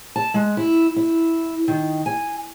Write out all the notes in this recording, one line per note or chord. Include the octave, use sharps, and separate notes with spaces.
A5
G#3
E4
E4
D#3
G#5